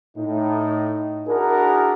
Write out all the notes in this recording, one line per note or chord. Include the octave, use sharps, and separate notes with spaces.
A2 D#4
D4 E4 F#4 G#4 A#4